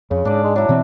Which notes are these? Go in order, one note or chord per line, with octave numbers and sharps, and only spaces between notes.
F2 C#3
G#2 D4 D5
G#3
F#3 D4 E4
B2 E3 C4